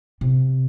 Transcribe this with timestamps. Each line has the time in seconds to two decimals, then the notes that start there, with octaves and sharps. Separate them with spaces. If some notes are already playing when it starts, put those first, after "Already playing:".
0.21 C3